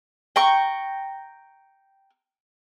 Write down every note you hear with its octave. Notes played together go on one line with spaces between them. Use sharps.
G5 A#5 C#6